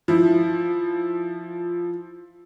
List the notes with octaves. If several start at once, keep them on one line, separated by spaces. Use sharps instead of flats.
F3 E4